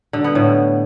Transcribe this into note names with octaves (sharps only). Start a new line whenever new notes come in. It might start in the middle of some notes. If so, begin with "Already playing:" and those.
D3
B3
A2